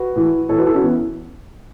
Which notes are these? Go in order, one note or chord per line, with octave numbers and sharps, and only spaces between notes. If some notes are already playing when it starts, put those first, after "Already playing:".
Already playing: F#4 B4
A2 E3
A2 E3 A4 C#5
F#4 B4
E4 A4
C#4 F#4
E3 B3 E4